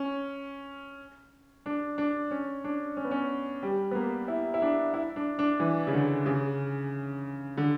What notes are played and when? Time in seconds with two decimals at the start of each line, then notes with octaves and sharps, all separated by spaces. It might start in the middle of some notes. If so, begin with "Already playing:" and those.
Already playing: C#4
1.66 D4
1.98 D4
2.31 C#4
2.64 D4
2.97 C#4
3.04 B3
3.11 C#4
3.63 G3
3.91 B3
3.95 A#3
4.28 E4
4.54 E4
4.62 D4
4.94 E4
5.16 D4
5.39 D4
5.60 E3
5.87 C#3
5.93 D3
6.26 C#3
7.57 D3